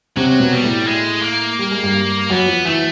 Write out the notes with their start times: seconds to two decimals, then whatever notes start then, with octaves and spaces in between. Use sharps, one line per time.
0.17 C3 F#3 C4
0.40 B2 B3
0.52 G3
0.64 A2 A3
0.88 G#3
1.23 A#3
1.59 G3
1.71 G#3
1.83 G2 G3
2.30 F#2 F#3 B3
2.48 F3
2.65 E3 A3